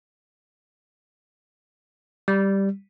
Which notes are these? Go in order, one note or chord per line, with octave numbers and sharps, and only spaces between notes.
G3